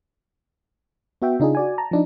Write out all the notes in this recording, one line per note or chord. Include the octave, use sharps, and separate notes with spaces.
B3 F#4 E5 G5
C#3 D4 D#4 F4 G#4
F#4 D5 G#5
A5 A#5
F3 D4 D#4